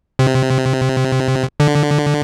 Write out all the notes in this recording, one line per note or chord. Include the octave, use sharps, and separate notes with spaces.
C3
D3